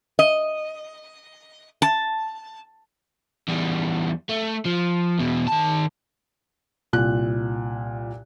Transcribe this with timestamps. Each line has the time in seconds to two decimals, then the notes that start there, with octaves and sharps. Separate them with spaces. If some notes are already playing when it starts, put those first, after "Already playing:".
0.19 D#5
1.82 A5
3.48 E2 G3
4.29 A3
4.65 F3
5.19 E2 B2
5.48 D#3 A5
6.93 C2 A#2 F#6